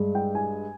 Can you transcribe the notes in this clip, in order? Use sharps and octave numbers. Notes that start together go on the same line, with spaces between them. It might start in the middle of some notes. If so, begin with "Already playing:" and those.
Already playing: G2 G#3
G5
G#5